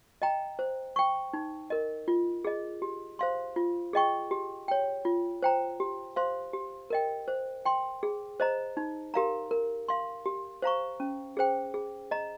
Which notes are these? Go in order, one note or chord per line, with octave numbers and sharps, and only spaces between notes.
D#5 G5 A#5
C5
G5 C#6
D#4
A#4 D#5
F4
G#4 D#5
G4
C5 F5 C6
F4
G#4 D#5 G5 C#6
G4
C#5 G5
F4
C5 G5 A#5
G4
C5 F5 C6
G4
A#4 D#5 G5
C5
G5 C6
G#4
C5 D#5 A#5
D#4
G4 A#4 F5 A#5
A#4
F5 C6
G4
C5 F5 A#5 C#6
C#4
G#4 C5 G5
G#4
D#5 A#5